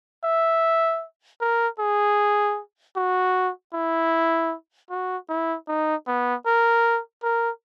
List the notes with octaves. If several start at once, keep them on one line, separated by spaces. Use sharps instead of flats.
E5
A#4
G#4
F#4
E4
F#4
E4
D#4
B3
A#4
A#4